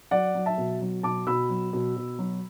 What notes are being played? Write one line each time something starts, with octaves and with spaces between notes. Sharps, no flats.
F#3 D5 F#5
F#3
E5 A5
B2
F#3
B2 A5 D6
B2 B5 E6
F#3
B2
B2
F#3